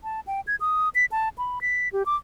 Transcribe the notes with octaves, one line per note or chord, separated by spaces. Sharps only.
A5
G5
G#6
D#6
B6
A5
B5
B6
G4
D6